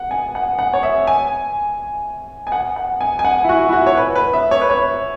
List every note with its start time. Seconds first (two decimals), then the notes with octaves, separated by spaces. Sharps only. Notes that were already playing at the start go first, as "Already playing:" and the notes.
Already playing: F#5
0.11 G#5
0.35 F#5
0.59 F#5
0.73 C#5
0.83 E5
1.07 G#5
2.47 G#5
2.52 F#5
2.76 F#5
3.01 G#5
3.19 G#5
3.25 F#5
3.44 E4
3.49 F#4
3.69 E4
3.73 F#4
3.87 C#5
3.97 B4
4.16 B4
4.33 E5
4.51 C#5
4.61 B4
4.70 C#5